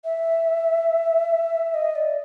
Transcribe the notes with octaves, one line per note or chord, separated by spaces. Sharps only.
E5
D#5
D5